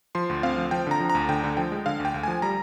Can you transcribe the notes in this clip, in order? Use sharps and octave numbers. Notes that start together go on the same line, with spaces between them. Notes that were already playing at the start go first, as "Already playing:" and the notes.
F3 C6
D2
C4 F5
F3
F3 G5
D3 A#5
F3
A#5
D2
D3 G5
D3
F3 G5
G#3
D3 F5
D2
G5
D2
F3 G#5
G3 A#5